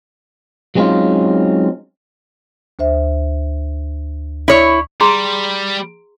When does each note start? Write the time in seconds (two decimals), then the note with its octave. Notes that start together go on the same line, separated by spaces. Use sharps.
0.75 F#3 G#3 C4 C#4 D#4 F4
2.79 D2 C5 E5
4.48 E4 C#5
5.01 G3 G#4 A#5 C6